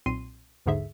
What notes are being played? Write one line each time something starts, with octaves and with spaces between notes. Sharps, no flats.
B1 A#2 C4 C6 C7 D#7
A#1 D#2 G#2 D3 G#4 E5